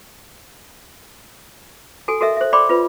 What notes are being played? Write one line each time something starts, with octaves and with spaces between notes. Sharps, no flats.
F#4 A4 G#5
F#4 A4 A#4 D#5 E5 E6
C5 E5
D5 G5 B5 C6 D6
F4 B4 D5